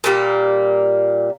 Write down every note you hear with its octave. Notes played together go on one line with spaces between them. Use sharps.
A#2 G3 A#3